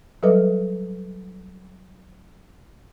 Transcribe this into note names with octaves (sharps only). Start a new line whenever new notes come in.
F#3 G3 A4 B4 D#5